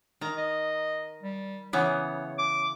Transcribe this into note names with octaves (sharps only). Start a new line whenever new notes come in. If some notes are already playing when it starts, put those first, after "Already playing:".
D#3 A#5
D#5
G3
C#3 E3 B3 C#5
D6